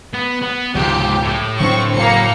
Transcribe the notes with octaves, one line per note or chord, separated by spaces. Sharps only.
B3
B3
C#2 G#2 C3 F3 G4
A2
D3 F#3 C4 D4 C#6
F#1 C#3 F#3 A#3 C#7